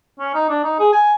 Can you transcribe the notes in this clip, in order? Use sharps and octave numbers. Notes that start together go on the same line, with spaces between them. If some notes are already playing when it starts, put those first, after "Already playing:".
C#4
D#4
D4
D#4
G#4
G#5